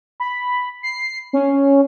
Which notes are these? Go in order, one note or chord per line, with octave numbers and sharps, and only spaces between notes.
B5
C7
C#4